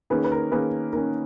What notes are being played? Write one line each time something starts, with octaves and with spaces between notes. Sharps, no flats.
D#3 A#3 C#4 G#4 B4
B4
A#4
D#3 A#3 C#4 G#4 B4
D#3 A#3 C#4 A#4